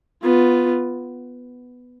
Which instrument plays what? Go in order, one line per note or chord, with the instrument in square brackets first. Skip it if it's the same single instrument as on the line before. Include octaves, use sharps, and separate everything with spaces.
[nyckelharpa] B3 [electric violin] F4